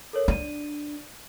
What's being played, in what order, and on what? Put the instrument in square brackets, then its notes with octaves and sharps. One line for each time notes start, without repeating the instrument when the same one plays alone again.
[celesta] A4 A#4 C#5
[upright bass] D4 [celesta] D5 D#7